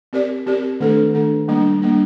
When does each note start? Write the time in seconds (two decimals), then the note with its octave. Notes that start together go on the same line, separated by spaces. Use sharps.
0.13 C4 G4 A#4 D5
0.46 C4 G4 A#4 D5
0.80 D#3 A3 D4 A4
1.14 D#3 A3 D4 A4
1.48 G3 A#3 D4
1.82 G3 A#3 D4